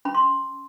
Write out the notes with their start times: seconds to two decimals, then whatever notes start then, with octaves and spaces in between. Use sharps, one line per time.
0.05 C#4 B5
0.15 C6